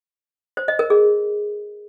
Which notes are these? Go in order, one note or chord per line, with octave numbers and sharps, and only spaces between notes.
C5
D#5
A#4
G#4